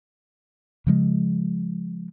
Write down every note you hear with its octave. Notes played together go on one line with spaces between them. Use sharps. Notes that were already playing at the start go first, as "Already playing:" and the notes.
C#3 F3 G#3